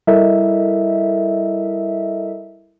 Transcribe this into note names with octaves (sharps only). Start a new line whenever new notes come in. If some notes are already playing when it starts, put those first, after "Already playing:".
G3 E4 A4 A#4 D#5 E5